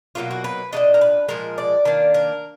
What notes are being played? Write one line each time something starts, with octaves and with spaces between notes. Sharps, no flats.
B2 F#3 A#3 D#4 F4
F#4
B4
A#2 F#3 D4 D#5
A#4
B4
A#2 F3 G#3 A#4
D5
D#3 A#3 D4
A#4